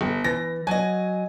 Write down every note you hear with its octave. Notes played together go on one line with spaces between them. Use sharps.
G1
E3 A#6
F#3 D#5 G#5